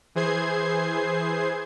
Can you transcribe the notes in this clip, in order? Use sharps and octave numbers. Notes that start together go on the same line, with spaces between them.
E3 G#4 C5 G#6 C7